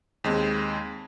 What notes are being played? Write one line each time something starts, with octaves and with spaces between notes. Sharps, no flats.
D#2 G#3 C4